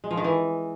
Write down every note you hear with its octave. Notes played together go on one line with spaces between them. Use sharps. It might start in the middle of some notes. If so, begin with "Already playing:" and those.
G#3
F3
D#3
E3